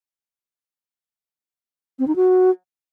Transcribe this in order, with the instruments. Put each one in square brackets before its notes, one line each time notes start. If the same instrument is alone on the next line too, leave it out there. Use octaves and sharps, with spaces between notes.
[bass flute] C4
D#4
F#4